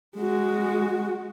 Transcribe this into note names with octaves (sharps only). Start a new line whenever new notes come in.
G#3 F#4